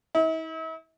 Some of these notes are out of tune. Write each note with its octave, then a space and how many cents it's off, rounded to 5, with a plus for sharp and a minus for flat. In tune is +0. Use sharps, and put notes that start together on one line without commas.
E4 -45